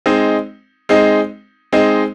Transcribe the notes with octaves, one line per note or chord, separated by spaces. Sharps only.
G#3 C4 D#4
G#3 C4 D#4
G#3 C4 D#4